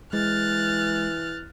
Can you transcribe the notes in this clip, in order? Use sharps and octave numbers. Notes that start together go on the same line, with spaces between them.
E3 G#3 F6 F#6 A6